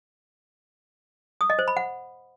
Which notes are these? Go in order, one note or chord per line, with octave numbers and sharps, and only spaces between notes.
D#6
D#5
C5
B5
F#5